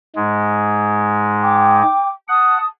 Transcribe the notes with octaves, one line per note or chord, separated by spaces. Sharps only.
G#2 G#3
G5 D6
F#5 A5 D#6